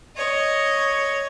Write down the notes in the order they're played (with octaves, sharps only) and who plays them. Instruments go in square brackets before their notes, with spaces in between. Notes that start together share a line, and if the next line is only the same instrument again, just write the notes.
[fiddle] C#5 [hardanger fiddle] D#5